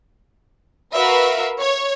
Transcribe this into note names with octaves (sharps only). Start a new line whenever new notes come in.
F#4 A#4 B4 E5 F5
C#5